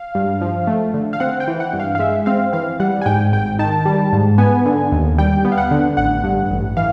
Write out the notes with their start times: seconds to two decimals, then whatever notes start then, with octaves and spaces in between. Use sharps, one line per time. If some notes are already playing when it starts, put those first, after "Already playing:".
Already playing: F5
0.15 G2
0.41 F3
0.67 A3
0.94 D3
1.13 F5
1.20 C4 F#5
1.40 G5
1.48 E3
1.60 F#5
1.73 G2
1.80 F5
1.95 F5
1.99 G#3 E5
2.26 C4 F5
2.53 E3 F5
2.80 G3 F#5
3.01 G#5
3.06 G#2 G5
3.32 G#1 G5
3.59 D#3 A5
3.85 G3
4.12 G#2
4.38 B3 G#5
4.66 D3
4.92 D#2
5.18 G3 G5
5.45 B3
5.52 F5
5.58 F#5
5.71 D3
5.97 A1 F#5
6.24 G2
6.51 A1
6.77 E3 F5